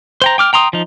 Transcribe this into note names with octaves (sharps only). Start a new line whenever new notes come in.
C5 G5 A#5
G5 D6 F6
G5 A#5 C6 D#6
F3 D#4